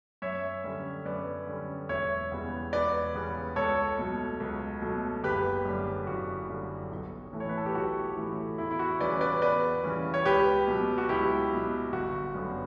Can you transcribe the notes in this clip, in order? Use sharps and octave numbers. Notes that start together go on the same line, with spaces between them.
F#2 C#5 E5
D3 G3 C#4
F#2 B4 D5
D3 G3 C#4
E1 C#5 E5
E2 C#3 G3 B3
E1 B4 D5
E2 C#3 G3 B3
C#2 A4 C#5
B2 F#3 A3
C#2
B2 F#3 A3
F#1 G4 B4
F#2 D3 G3
F#1 F#4
F#2 D3 G3
B1
A2 E3 A3
C#5
B4
A4
G4
B1 F#4
A2 E3 A3
E2 E4
E4
F#4
C#3 E3 G3 C#4 B4 D5
B4 D5
E2 B4 D5
C#3 E3 G3 C#4
C#5
C#2 G4 B4
B2 F#3
F#4
C#2 E4 G4
B2 F#3
G1 F#4
F#2 D3 G3 B3